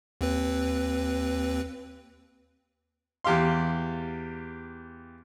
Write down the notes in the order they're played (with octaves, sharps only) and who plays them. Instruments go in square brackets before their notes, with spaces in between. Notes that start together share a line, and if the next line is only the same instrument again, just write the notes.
[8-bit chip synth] D#2 C4 B4
[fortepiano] E2 G4 F5 C6